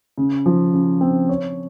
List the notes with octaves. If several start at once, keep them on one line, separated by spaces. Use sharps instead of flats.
C#3
F3
C#3
C4
C#5